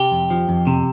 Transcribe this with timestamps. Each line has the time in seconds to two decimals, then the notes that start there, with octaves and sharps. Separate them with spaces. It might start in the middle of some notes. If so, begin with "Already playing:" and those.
Already playing: C3 G4
0.12 F2
0.30 F3
0.49 F2
0.67 C3